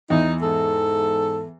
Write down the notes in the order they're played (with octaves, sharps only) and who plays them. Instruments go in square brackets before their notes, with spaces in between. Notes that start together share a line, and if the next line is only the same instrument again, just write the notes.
[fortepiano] E2 [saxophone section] D#4
[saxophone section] G#2 A4